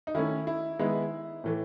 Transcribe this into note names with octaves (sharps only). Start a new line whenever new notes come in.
D#4
D#3 A3 C#4 E4
E4
D#3 G#3 B3 E4
A2 E3 A3